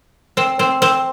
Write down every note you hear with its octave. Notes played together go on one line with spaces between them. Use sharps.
C4
C4
C4